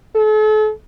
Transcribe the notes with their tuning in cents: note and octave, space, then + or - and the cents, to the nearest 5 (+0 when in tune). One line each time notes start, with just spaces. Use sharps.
A4 -40